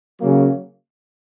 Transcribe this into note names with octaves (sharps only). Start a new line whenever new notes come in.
C#3 F#3 A#3